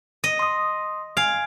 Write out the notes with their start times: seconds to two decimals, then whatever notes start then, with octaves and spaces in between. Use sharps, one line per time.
0.24 D#5
0.39 C6 D#6
1.17 F5 G#5 G#6 D7